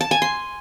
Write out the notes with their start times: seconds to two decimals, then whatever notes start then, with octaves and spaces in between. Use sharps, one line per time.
0.01 A5
0.11 G#5
0.22 C6